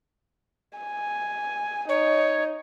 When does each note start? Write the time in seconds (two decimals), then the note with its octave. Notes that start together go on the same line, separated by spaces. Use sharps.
0.78 G#5
1.89 D#4 C#5